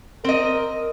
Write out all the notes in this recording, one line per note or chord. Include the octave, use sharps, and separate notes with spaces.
C4 A#4 D#5